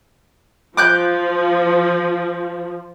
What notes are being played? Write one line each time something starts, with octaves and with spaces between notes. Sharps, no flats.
F3 D6 F#6 G6